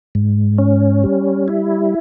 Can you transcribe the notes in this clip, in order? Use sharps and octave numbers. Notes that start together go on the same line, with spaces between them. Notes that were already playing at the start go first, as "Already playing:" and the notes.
G#2
C#4
G3
E4